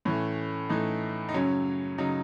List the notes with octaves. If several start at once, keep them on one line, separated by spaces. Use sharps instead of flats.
A2 E3 A3 C#4
A2 E3 A3 D#4
D#4
F#2 C#3 F#3 C#4
C#3 F#3 D#4